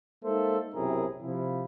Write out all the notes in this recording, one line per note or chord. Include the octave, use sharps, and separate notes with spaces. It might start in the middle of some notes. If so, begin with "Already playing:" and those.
G#3 A#3 D#4 A4 C5 E5
B1 F#2 C3 E4 G#4 A#4
C3 F3 E4